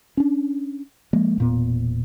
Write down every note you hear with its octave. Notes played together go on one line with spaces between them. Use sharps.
C#4 D4
F3 G#3 A#3
E1 A#2 B3